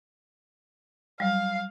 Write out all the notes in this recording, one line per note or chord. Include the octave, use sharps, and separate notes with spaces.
F#3 G3 F5